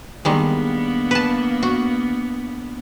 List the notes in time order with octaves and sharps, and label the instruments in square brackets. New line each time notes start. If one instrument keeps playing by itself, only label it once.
[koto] D#3 G3 G#3 [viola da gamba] A#3 B3 D4
[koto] B4 A5
F#4